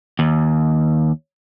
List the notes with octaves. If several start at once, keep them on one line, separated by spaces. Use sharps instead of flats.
D#2